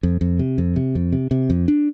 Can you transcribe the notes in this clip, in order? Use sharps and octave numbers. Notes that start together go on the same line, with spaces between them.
F2
F2
C3
F2
C3
F2
C3
C3
F2
D4